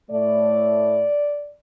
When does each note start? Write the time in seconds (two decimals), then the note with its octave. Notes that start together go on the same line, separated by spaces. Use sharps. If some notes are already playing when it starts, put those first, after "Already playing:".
0.10 A2 A3 D5